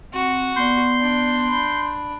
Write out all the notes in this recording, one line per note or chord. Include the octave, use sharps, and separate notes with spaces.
C4 F#4
B3 D5 C6 G6
D4
B5